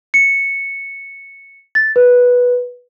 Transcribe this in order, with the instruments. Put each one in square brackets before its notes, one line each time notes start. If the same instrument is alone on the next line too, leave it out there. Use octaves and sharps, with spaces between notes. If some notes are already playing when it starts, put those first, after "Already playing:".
[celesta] C#7
A6
B4